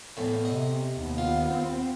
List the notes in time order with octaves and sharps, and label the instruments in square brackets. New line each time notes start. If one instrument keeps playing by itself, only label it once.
[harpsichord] E2 A2
[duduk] C3 [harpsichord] D#5
[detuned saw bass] D#2 [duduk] B3
[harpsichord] F4
[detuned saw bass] C4